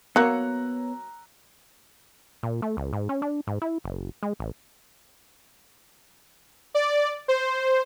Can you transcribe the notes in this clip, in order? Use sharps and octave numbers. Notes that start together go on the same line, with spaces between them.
F#3 A#3 B3 C#5 A#5 E6 F#6
A#2
A3
C#2
G#2
C#4
D4
G#2
E4
F#1
G#3
A1
D5
C5